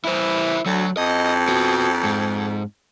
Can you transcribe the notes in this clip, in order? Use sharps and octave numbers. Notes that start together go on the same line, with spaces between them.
E3 E4 C5
D2 F#3
F2 D#5
B3 F#4
G#2